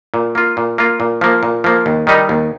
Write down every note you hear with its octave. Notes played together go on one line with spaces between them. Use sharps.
A#2
A#3 F4
A#2
A#3 F4
A#2
F3 A#3
A#2
F3 A#3
D#2
D#3 G3 D#4
D#2